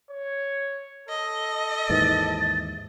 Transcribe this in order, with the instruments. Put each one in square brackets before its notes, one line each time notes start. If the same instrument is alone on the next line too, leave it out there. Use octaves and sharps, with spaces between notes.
[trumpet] C#5
[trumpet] A4 [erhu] D#5
[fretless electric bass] D#2 G#2 E3 [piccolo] A6